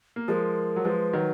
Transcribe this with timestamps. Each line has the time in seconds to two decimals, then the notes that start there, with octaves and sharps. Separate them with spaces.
0.16 A#3
0.28 F3 G#3 A#4
0.76 F#3
0.85 F3 G#3 B4
1.13 D#3 F#3